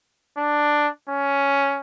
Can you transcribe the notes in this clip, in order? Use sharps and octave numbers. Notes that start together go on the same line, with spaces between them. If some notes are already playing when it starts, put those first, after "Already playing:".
D4
C#4